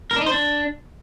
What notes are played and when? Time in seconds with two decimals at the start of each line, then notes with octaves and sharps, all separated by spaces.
0.11 A#4
0.16 D4
0.21 D#4
0.26 C5
0.32 D4